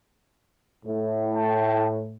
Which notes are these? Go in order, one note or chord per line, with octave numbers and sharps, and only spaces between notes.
A2
G5 A5